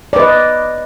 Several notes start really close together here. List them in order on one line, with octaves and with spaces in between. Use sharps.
D5 B4 D#5